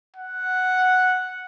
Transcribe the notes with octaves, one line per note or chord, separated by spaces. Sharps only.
F#5